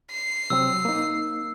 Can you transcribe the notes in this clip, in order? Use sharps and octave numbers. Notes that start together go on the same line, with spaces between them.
C7
C3 F#3 C4 E6
A#3 D#4